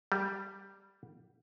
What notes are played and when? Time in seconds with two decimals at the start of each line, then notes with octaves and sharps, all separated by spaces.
0.12 G3